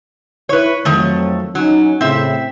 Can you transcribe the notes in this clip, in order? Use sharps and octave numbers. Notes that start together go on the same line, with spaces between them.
E4 B4 C#5
F2 D#3 F#3 A3
F#3 C#4 D#4
A2 C#3 C4 E5